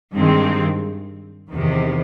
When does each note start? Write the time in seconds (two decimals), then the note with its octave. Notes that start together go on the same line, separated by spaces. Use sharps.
0.15 G2 D#3 G#3 C4
1.53 E2 C3 D#3